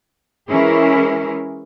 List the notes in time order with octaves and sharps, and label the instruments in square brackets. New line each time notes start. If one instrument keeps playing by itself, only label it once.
[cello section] E3 G#3 C#4 E4 G#4 A#4